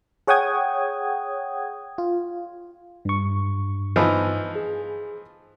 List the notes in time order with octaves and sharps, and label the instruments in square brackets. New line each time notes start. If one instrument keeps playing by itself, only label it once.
[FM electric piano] G#4 C#5 F#5 G5 D#6 G#6
F4
[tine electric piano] G2 C#6
[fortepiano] E3 F3 D#4
[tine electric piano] G#4